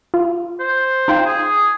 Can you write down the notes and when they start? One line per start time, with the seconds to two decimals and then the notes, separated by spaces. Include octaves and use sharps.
0.14 F4
0.60 C5
1.08 D#4 F4 G5
1.25 G#4